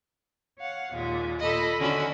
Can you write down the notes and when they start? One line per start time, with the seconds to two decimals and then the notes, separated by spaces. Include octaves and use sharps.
0.59 C#5 F5 F#5
0.93 D#2 A#2 G#3
1.39 A#2 A4 D#5 B5
1.79 D3 D#3 C#4 F#4 B5 D#6